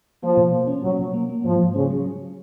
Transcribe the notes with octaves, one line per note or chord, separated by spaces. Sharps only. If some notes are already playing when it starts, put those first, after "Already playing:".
F3 A#3
B2
A#3
C#4
B2 F#3
B2
A#3
A#3
G#2 F3
G#2
C#3 C#4
F#3
F#3